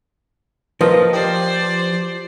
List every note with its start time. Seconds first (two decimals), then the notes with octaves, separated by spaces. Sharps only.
0.81 F3 A#3 B4 D#5 F5
1.13 G4 C5 D5